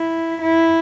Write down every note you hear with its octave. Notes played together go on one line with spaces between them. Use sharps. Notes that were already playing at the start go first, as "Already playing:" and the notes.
Already playing: E4
E4